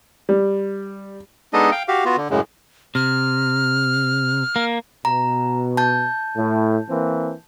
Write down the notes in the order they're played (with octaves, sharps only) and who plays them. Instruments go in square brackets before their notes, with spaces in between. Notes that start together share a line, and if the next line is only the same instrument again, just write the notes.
[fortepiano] G3
[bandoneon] G#3 B3 D4 D#4 A4 D#5
F5 G5
F#4 G4 F5
B3 F4 F#4
D3
F#2 A2 C#3 G#3
[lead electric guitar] C3 [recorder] F6
[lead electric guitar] A#3
[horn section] B2 [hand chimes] A#5
[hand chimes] A5 G6
[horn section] A2
E3 A#3 C4